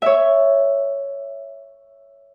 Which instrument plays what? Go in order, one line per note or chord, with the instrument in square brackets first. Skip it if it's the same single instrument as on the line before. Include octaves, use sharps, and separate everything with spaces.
[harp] C#5 E5